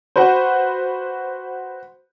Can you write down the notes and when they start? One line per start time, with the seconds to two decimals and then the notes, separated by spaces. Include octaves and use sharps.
0.16 F#4 B4 C5